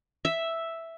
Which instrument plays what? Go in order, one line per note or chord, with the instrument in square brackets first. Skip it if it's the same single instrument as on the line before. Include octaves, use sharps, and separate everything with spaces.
[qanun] E5